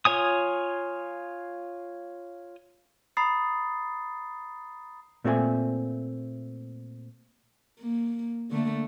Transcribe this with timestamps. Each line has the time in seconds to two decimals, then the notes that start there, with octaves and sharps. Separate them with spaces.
0.05 F4 C#5 G#5 D#6
3.17 A#5 B5 D#6 A6 C7
5.24 A#2 A3 C4 A4 E5 G#5
7.80 A#3
8.51 D3 A3 A#3